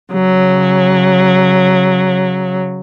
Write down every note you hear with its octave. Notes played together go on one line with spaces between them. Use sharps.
C#3 F#3